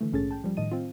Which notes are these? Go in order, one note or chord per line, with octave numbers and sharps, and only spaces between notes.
D3 E3 A3
A#1 G#2 C#4 G#4 A4 A6
G5 A5
F3 G3
A2 D#3 D#5 A5 D#7
C4 F4